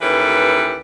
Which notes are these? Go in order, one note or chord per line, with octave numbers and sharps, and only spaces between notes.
D#2 E3 C#4 G4 A4 B4